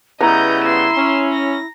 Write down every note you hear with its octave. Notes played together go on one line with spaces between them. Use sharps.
C#3 G3 B3 E4 D#5 A#5 G6
C6 E7
C#4
A#6